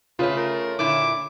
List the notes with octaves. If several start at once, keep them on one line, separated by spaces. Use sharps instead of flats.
C#3 A3 F4 B4 C#5
A#4
A#2 D3 E4 D6